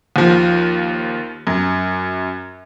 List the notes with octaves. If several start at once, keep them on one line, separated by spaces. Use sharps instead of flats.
D#2 F3
F#2